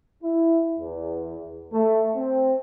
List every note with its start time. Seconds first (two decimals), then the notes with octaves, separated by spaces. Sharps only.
0.24 E4
0.80 E2
1.73 A3
2.16 C4